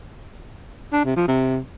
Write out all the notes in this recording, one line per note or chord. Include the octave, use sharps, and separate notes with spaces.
D4
C3
F3
C3